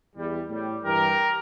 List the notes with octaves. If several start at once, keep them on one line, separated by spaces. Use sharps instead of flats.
E2 E3 G3
A2 G3
G2 E3 G3 G4 A#4